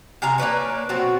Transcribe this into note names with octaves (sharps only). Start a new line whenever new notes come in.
C3 G#4 F5 A#5
A#3 D4 B4 C#5
B2 F#3 C4 F#4